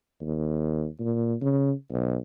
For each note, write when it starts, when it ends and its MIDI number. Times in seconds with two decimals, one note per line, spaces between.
0.21 0.86 39
1.00 1.34 46
1.41 1.72 49
1.92 2.16 35